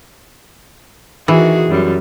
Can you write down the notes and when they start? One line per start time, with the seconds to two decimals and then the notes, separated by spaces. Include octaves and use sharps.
1.28 D#3 E3 F#4 G#4
1.69 F#2 G3